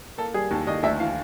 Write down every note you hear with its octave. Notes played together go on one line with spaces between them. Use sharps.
A#3 A4
G3 G#4
D#2 A4
D#2 D#5
D2 E5
E3 F5